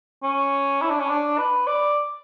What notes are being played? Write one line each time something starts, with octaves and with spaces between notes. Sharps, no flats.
C#4
E4
D4
C#4
D4
B4
D5